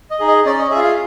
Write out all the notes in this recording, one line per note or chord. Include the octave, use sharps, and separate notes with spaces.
D#5
D#4 G#4
D#5
C#4 D5
D#5
F4 G#4 E5
F5